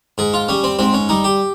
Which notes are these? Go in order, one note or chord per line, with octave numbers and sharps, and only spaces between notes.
G#2 G#4
F4
G3 C#4
C4
G#2 C4
C#4
G3 D#4
G4